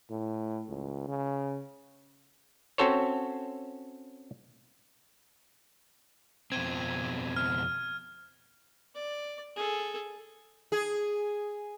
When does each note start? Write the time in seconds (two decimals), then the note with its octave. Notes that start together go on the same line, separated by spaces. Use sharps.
0.11 A2
0.68 C#2
1.08 C#3
2.78 C4 C#4 F#4 A4 C5 C#5
6.52 F2 B2 C4 G#6 D#7
7.36 F6
8.95 D5
9.56 G#4 A4
10.72 G#4